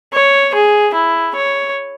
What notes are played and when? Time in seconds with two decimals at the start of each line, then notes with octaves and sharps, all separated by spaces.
0.13 C#5
0.54 G#4
0.94 E4
1.35 C#5